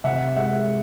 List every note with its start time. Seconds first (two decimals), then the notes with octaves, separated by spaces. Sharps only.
0.04 C3 E5 F#5
0.36 G#3 E5 F#5